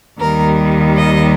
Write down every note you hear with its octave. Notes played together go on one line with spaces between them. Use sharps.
D#2 D#3 G3 A#4
D#5